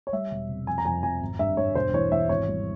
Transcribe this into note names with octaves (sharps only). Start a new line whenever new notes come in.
C#5
G3 E5
E1
C3
F2 G#5
A#5
F2 G#5
F2 G#5
G#1
G2 E5
G2 C#5
E1 C5
E3 C#5
E3 E5
G#1 C#5
G3